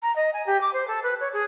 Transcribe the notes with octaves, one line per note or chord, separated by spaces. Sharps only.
A#5
D#5
G#5
G4
D6
C5
A4
B4
C#5
G#4